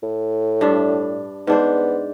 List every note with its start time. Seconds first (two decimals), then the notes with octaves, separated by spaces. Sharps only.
0.03 A2
0.61 G2 D4 E5
1.47 G#2 B3 D4 C5